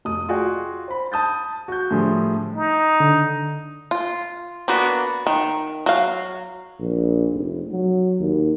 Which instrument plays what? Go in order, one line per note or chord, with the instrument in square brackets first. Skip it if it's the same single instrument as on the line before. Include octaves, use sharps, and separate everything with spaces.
[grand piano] F1 D#6
F4 F#4 G#4 D5 G5
C5 B5
A5 D#6 G6 A6
F#4 G6
A2 D3 F3 G3 G#4
[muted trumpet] D#4
[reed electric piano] D3
[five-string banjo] F4
A#3 B3 D4 F#4 B4
D#3
F#3 F5
[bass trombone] A#1
F1
F#3
D#2